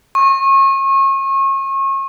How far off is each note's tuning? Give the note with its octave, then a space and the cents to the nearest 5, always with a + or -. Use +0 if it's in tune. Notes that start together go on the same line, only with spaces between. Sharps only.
C#6 -35